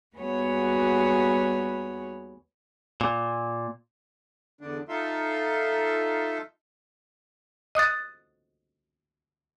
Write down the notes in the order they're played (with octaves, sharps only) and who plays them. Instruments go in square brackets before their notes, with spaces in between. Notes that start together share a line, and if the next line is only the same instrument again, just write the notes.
[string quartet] D#2 G3 B3 F#4 G#4 C#5
[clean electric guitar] A#2
[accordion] E2 D3 D4
D#4 F4 A4 E5 C6
[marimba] D#5 D#6 F#6 A6